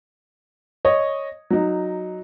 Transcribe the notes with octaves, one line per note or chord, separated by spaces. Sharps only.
C#5 D#5
F#3 D#4